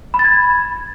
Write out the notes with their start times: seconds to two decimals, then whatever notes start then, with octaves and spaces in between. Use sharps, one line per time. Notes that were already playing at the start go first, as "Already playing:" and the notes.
0.14 B5
0.19 A6
0.25 G#6